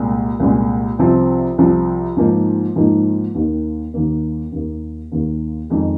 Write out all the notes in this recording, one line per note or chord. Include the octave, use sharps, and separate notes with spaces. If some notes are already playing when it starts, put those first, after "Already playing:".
Already playing: C2 A#2 G#3
C2 A#2 G#3
C2 C3 F3 C4
C2 C3 F3 C4
G#2 F3 A#3 D#4
G#2 F3 A#3 D#4
D#2 D#3 A#3
D#2 D#3 A#3
D#2 D#3 A#3
D#2 D#3 A#3
F2 D#3 G#3 D#4